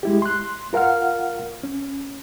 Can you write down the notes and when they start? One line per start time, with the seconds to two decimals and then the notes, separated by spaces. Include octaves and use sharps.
0.03 G#3 E4 G4
0.22 C6 F#6
0.73 F4 A#4 F5 F#5 F6
1.63 C#4